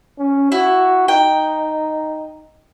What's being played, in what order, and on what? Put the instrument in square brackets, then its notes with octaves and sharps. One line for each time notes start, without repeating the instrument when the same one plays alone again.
[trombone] C#4
[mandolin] E4 [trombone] F#4
[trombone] D#4 [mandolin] G5